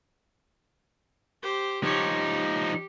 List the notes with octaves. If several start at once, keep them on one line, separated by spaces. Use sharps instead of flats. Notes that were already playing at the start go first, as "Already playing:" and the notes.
G4 C5
F3 D#4 G4 C#5
G4